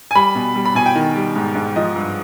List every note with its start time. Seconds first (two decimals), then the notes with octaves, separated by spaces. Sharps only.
0.11 G#5
0.15 G3 B5
0.35 B2
0.56 G3
0.66 B5
0.75 B2 G#5
0.86 G5
0.95 D#3
1.16 G3
1.36 G#2
1.55 G#2
1.76 F3 D#5
1.96 G2